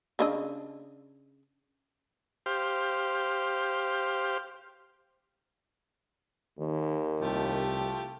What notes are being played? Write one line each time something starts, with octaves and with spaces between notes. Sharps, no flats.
C#3 D4 D#5
G4 C5 F5
D#2 D#3
C2 F3 A3 G4